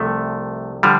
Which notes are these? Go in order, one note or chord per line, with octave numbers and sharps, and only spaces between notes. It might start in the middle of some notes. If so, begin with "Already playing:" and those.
Already playing: C2 C3 F3 A3
D3 F3 G3